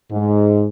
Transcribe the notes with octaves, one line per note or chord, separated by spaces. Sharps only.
G#2